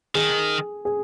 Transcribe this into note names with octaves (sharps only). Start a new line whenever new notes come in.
D#3 G#4
G#4